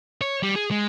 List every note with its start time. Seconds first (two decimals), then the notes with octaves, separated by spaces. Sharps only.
0.21 C#5
0.43 G3
0.56 G#4
0.71 G#3